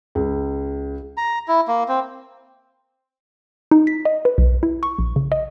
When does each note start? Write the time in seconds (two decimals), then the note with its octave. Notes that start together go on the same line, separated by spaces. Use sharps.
0.15 C#2
1.17 A#5
1.48 E4
1.68 A#3
1.89 C4
3.71 D#4
3.87 B6
4.05 D#5
4.25 B4
4.38 B1
4.63 E4
4.83 C#6
4.98 A#1
5.16 C#3
5.32 D#5